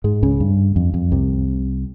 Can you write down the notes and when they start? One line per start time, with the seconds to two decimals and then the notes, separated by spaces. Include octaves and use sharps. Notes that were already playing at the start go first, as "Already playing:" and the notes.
0.04 G#2 G#3
0.22 C#2 C#3
0.40 G2
0.76 F2
0.94 F2
1.12 C2 C3